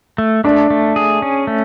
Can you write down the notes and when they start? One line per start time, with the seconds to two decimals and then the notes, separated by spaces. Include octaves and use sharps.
0.18 A3
0.44 A3 D4
0.70 A3
0.96 G#4
1.22 C#4
1.47 A3